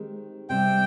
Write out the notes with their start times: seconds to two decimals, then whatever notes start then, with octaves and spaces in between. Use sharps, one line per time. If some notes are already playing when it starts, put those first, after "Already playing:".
Already playing: D#3 G#3 C4 G4
0.49 C3 G3 C4 G5